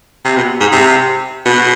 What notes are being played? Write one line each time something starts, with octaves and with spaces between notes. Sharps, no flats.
C3
B2
G#2
C3
B2